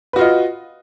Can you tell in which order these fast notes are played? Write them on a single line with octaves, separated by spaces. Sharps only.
B4 F#4 F4 D#5